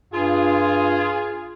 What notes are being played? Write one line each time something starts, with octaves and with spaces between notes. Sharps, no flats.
G2 F4 G#4